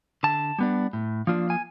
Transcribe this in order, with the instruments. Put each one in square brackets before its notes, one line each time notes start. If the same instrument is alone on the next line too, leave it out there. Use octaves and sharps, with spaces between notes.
[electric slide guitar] D3 A5
G3 B3 D4
A2
F3 A#3 D4 F4
G#5